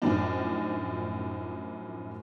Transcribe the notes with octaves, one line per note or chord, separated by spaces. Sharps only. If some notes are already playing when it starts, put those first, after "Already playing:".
F#2 A2 F3 D4 D#4